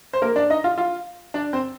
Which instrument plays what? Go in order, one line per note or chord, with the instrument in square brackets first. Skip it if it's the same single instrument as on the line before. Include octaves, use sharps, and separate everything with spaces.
[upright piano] C5
A#3 A#4
D4 D5
D#4 D#5
F4 F5
F4 F5
D4 D5
C4 C5